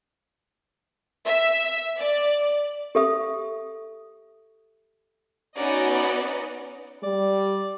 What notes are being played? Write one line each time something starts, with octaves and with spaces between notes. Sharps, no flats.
E5
D5
G4 A4 E5 D#6
B3 C#4 D#4 F#4 D5 D#5
G3 D5